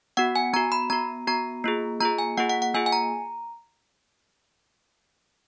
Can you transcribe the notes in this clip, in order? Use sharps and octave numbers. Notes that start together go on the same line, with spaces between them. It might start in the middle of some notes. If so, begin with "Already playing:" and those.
B3 F#4 F#5
G#5
B3 F#4 A#5
B5
B3 F#4 A#5
B3 F#4 A#5
A#3 F4 G#4
A#3 F4 G#4 A#5
G#5
A#3 F4 G#4 F#5
F#5
F#5
A#3 F4 G#4 G#5
G#5
A#5